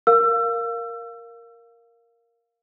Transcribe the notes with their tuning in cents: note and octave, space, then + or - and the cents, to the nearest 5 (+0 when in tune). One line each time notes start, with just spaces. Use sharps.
A#4 +0 F5 +0 E6 +30